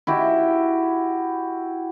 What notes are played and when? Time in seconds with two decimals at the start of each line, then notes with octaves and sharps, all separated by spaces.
0.07 E4 F#4 G4